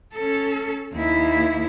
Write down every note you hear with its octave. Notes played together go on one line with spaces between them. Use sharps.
C#4 A4
D#2 E4